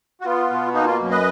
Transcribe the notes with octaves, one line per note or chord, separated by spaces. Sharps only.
F#4
B3 F4
B2
A#3 D#4
F4
F#2
B4 D#5